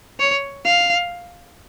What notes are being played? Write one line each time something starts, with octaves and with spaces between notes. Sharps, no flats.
C#5
F5